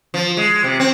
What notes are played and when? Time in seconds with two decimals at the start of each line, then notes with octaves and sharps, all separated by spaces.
0.14 F3
0.37 G#3
0.64 C3
0.80 C4